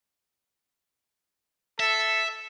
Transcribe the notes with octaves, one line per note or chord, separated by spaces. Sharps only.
A4 E5